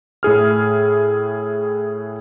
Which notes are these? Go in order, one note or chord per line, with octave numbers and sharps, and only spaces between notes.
A2 E4 G#4 F6